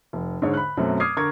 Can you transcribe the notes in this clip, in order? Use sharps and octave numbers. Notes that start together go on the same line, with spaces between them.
F1
G#2 D3 G#3 C#5
B5 F#6
F#2 B2 F#3 A3 C4 C#4
D6 D#6 F6 G#6 C7
D3 A#4 C#6 G#6